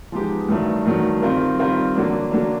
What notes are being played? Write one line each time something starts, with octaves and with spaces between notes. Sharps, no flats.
F3 G#3 B3 D#4 G4
G2 D#3 F#3 A3 D4
G2 D#3 F#3 A3 D4
D#3 G3 C4 F4 A#4
D#3 G3 C4 F4 A#4
D3 F#3 A#3 D4
D3 F#3 A#3 D4